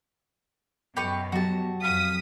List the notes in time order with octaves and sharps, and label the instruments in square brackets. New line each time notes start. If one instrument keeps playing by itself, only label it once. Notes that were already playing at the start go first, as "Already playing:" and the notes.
[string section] F#2 B2 [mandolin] G4 B4 C#6
[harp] F#3 G4 [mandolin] F#4 A5
[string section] F2 D#6 B6 [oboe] F5